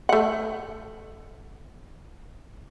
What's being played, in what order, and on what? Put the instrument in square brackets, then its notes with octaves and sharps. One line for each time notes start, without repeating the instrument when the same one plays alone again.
[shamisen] A3 F#5